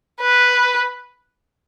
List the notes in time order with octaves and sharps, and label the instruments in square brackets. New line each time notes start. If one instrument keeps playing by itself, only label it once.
[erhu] B4